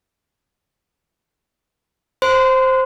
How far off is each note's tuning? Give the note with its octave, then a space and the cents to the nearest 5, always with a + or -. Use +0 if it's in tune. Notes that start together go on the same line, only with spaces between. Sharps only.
C5 +0 C6 -30